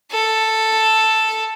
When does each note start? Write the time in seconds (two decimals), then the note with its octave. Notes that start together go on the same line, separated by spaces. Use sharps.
0.11 A4